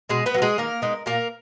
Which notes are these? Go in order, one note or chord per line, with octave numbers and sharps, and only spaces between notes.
B2 G#3 G#4
B3 B4
F#3 A#3
G#3 G#4
D#3 A#3 A#4
G#3 B3 D#4
A#2 A#3 A#4